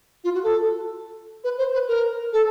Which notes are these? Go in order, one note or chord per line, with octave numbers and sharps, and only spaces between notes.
F4
F#4
A4
B4
C5
B4
A#4
A4